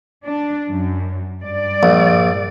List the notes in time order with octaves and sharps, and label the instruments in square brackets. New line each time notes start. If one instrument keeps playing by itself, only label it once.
[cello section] D4
F#2
G2 D5
[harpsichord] A#1